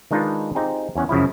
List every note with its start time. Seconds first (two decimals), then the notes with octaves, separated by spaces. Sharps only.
0.11 D#3 G#3 D4 D#4 F4 B4
0.55 C4 D#4 F4 G4 G#4
0.96 E2 C#4 F#5
1.09 F#2 C#3 F3 E4